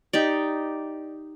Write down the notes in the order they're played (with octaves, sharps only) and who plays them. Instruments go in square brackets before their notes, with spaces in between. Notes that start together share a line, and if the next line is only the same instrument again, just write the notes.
[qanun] D#4 G4 D5